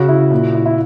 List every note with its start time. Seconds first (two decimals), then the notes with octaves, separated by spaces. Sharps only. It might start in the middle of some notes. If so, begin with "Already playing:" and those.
Already playing: C#3 F#4
0.09 E4
0.31 A#2
0.54 E4
0.66 E4